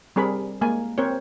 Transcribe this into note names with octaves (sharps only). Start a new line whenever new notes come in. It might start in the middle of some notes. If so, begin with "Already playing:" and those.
G3 C4 G#4 A#4 B5
G#3 A#3 G#5
C4 A#4 C5 C#5